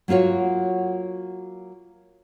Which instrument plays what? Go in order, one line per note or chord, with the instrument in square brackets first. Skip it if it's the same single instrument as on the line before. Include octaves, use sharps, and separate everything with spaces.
[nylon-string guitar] F#3 A#3 F4 F#4 C#5